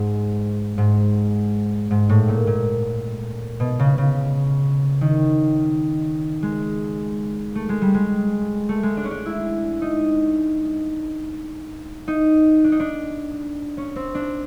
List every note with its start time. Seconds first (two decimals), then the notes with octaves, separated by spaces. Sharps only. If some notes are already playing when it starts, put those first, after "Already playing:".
Already playing: G#2
0.78 G#2
1.91 G#2
2.09 A2
2.28 A#2
2.47 A#2
3.60 B2
3.79 C#3
3.98 C#3
5.01 D#3
6.43 G#3
7.55 A3
7.69 G#3
7.82 G3
7.94 G#3
8.69 A3
8.83 G#3
8.97 D4
9.04 C#4
9.11 D4
9.26 E4
9.82 D#4
12.08 D#4
12.64 D4
12.72 D#4
12.80 D4
13.77 C#4
13.96 C4
14.15 D4